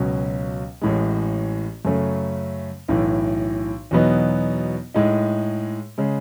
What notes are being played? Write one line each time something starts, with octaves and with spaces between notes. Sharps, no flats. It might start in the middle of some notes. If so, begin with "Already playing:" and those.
Already playing: C#2 B2 F#3 C#4
A1 A2 G#3
F#2 C#3 F#3 A3
B1 A2 E3
E2 B2 F#3 B3 D#4
A2 G#3 D#4
C#3 G#3